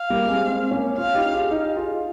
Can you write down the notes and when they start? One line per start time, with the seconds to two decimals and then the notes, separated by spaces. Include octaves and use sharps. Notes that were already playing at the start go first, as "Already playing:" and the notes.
Already playing: F5
0.10 G3 A#3
0.28 G#3 C4
0.45 G#3 C4
0.71 A#3 C#4
0.97 C#4 F4 F5
1.15 D#4 G4
1.32 F4 G#4
1.51 D#4 G4
1.76 F4 G#4